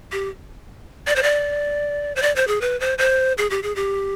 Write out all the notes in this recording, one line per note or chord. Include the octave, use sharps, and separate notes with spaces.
G4
D5
C5
D5
C5
D5
C5
G#4
B4
C5
C5
G#4
G4
G#4
G4